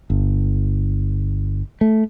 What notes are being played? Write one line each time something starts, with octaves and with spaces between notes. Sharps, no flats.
G1
A3